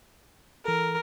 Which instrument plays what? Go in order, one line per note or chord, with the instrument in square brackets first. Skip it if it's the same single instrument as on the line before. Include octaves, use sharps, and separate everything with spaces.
[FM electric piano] E3 A4 [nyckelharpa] A#4